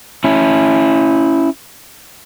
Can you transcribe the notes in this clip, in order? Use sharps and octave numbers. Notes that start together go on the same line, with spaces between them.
C#4 E4